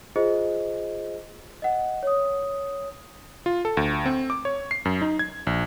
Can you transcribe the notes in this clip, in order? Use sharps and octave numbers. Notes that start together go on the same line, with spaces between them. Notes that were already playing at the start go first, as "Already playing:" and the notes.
F4 G#4 C5 D#5
D#5 F#5
C#5 D#6
F4
A4
D2
C4
D6
C#5
C7
F#2
D#4
G#6
A#1